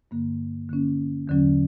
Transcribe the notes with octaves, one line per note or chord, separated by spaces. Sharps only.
G2 D3 A#3
D3 A#3 C#4
E2 D3 F#3 C#4